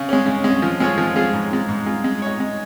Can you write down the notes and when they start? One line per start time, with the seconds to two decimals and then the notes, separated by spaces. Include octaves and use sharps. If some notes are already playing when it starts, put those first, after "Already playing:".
Already playing: C#3
0.09 G#3 C#4
0.26 C#3
0.44 G#3 C#4
0.62 F3
0.80 G#3 F4 G#4 C#5
0.98 F3
1.16 G#3 F4 G#4 C#5
1.33 G#2
1.51 G#3 F4
1.68 G#2
1.86 G#3 F4
2.04 G#3
2.22 D#4 C#5
2.40 G#3